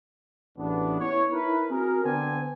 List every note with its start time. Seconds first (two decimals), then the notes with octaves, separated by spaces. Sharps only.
0.57 A1 E2 B3 D4
1.00 B3 E4 C#5
1.32 D#4 E4 A#4 B4
1.71 C4 F#4 G#4 A#4
2.03 D3 B3 C4 D4 G#5